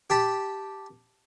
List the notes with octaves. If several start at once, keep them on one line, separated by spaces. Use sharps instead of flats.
G4 A5 B5